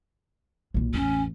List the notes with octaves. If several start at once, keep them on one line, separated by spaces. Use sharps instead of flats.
B1 A#2
A1 E2 C#4